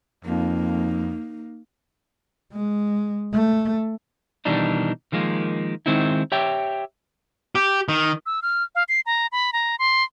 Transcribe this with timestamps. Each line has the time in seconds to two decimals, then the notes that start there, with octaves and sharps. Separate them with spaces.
0.25 F2 A#3 D#4
2.53 G#3
3.33 A3
4.45 B2 D#3 E3 G3 D4 D#4
5.12 D#3 F3 G#3 A#3
5.86 D#3 G#3 C4 D#4 E4
6.32 G4 C#5 E5 G5
7.55 G4
7.89 D#3
8.26 E6
8.42 F6
8.75 F5
8.89 C7
9.06 A#5
9.32 B5
9.53 A#5
9.79 C6